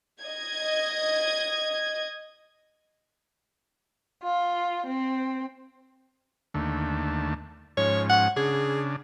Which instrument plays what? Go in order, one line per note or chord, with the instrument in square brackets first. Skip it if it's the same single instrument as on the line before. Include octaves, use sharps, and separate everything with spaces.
[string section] D#5 G#6
[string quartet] F4
C4
[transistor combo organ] D#2 D3 A3
[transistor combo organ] G#2 F3 C#4 [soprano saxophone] C#5
[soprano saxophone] F#5
[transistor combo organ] C#3 D4 [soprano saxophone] G#4